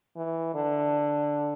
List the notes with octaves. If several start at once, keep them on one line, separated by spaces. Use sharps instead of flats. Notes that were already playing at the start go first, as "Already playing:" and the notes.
E3
D3